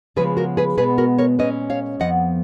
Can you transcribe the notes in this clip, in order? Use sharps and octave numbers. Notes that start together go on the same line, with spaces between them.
C#3 F3 G#3 B3 G#4 B4
F#4 A#4
G#4 B4
B2 G#3 B3 G#4 B4
F#4 A#4
A#4 C#5
A#2 G#3 C#4 B4 D#5
C#5 F5
F2 F3 B3 D#5 F#5